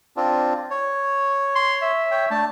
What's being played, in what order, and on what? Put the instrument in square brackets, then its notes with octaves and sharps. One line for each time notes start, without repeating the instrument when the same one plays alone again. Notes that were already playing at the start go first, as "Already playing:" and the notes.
[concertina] C4 D4 F4
C#5
[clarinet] C6
E5
[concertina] C#5 G5
[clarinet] A3 [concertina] D4 A5